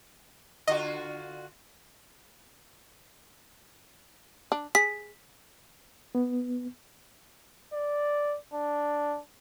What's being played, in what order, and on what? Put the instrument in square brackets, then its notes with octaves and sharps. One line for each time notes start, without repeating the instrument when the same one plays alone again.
[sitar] D3 F4 F#4 [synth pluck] D#5
[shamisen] D4
[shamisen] G#4 [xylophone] B6
[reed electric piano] B3
[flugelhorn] D5
D4